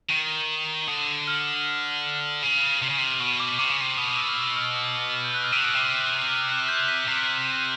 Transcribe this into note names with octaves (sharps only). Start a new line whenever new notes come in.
D#3
D3 D#6
F6
C#3
C3
C#3
C3
B2 C#6
D6
C3 D6
C#3
C3
B2 D#6
D#6
E6
F6
E6
E6
F6
F6
F6
G6
F#6
F6
C3 E6
B2
C3
F6
F#6
G6
B6
C3